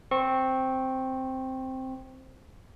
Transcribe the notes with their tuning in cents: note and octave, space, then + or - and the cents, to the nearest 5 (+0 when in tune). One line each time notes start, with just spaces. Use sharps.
C4 +0 C#6 -25